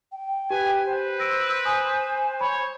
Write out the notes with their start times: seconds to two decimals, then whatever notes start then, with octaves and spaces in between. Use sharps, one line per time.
0.12 G5
0.50 G4 B4 G#5
0.85 B4 C5
1.20 E6 A#6 D7
1.65 G#5 D#6
2.41 C#5 B5